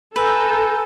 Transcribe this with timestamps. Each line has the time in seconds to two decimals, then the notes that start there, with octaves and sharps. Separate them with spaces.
0.16 A4 B4 G#5 A#5 E6 G6